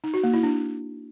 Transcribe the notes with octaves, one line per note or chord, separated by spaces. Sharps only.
D#4
F#4
A#3
E4
D4